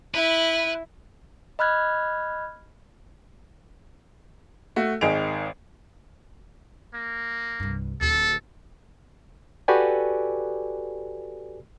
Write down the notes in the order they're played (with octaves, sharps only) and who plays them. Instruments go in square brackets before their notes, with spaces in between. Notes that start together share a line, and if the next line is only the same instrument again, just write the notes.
[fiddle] E4 [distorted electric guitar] B4
[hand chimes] D#5 B5 F6 F#6 G#6
[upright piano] A3 F#4
G#1 D#3 D#4 G#4 D7 F7
[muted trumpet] A#3
[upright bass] C2 G2
[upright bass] D1 D2 [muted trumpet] A4
[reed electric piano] F#4 G4 A4 B4 D5 G#5